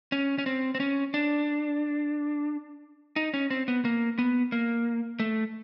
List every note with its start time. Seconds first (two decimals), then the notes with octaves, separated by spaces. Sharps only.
0.12 C#4
0.38 C#4
0.46 C4
0.75 C4
0.80 C#4
1.14 D4
3.16 D#4
3.34 C#4
3.50 C4
3.68 B3
3.85 A#3
4.18 B3
4.52 A#3
5.20 A3